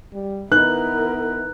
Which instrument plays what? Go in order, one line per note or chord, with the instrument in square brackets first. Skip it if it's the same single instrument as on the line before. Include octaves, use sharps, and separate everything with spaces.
[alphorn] G3
[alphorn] B3 [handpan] D#4 B4 [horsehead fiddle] E4 A#4 [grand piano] F#6